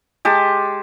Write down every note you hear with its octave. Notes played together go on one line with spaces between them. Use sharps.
G#3 G4 A5